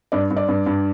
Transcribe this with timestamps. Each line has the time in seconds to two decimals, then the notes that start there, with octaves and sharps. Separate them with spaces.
0.12 G2 D5
0.30 G2
0.36 D5
0.48 G2
0.66 G2